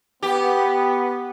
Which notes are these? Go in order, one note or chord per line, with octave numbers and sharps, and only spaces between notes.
B3 G4